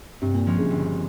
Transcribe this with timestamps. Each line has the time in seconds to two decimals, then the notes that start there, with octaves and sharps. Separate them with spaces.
0.22 G2 C3
0.34 A#2
0.46 F3 G#3 C#4 F4
0.58 C#3
0.70 G1